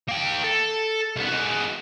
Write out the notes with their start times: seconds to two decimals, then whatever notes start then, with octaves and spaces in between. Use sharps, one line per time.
0.09 A#3 G5
0.44 A4
1.16 C2 B3
1.28 G#3 F#4